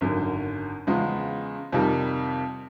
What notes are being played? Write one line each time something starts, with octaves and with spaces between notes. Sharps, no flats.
G#1 F#2 D3
E2 C#3 F3 G#3
F2 C3 D#3 G3